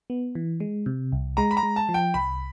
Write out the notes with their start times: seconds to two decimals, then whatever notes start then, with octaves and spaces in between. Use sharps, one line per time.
0.10 B3
0.35 E3
0.60 G#3
0.86 C3
1.12 C2
1.37 G#3 A#5
1.51 B5
1.57 A#5
1.63 G#3
1.76 A5
1.89 F3
1.94 G5
2.14 C2 B5